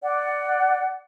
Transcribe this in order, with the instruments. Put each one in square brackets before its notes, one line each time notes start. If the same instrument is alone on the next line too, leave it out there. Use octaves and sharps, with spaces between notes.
[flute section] D5 F#5